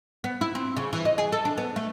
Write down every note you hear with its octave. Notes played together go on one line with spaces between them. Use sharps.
B3
E4
C4
C#3
E3
D#5
G#4
A4
D4
B3
A3